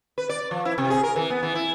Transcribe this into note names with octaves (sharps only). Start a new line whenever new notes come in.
B4
D5
F3
E4
C3
G#4
A#4
E3
B3
E3
E4